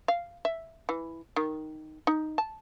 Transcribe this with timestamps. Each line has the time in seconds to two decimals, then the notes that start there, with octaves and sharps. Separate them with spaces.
0.08 F5
0.45 E5
0.89 E3
1.36 D#3
2.07 D#4
2.38 A5